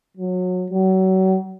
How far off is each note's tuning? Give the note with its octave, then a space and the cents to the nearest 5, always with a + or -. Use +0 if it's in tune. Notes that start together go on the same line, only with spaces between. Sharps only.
F#3 -25
F#3 +30